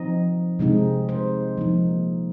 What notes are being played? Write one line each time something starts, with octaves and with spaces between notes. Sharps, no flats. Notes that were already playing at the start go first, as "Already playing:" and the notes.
Already playing: F3 C4 D#4 D#5
C3 G#3 C4 D#4
C5
F3 A#3 D#4